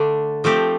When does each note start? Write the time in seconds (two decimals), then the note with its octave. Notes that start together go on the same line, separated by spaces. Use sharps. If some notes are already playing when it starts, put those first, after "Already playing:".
Already playing: D3 A3 D4
0.44 F3 A3 C4 G4